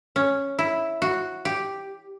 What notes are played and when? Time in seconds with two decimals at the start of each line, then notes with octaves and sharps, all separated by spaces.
0.16 C#4
0.59 E4
1.02 F#4
1.45 G4